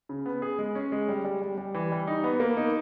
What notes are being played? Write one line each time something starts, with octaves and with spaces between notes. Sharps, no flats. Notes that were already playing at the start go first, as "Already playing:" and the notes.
C#3
B3
G#4
G#3
C#4
G#3
G3
G3
G3
G3
E3
G3
D#4
B3
A#3
D#4